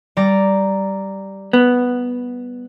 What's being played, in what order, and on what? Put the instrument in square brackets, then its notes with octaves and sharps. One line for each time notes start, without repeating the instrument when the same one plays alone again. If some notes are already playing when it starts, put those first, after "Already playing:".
[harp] G3 D5 A#5
[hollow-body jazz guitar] B3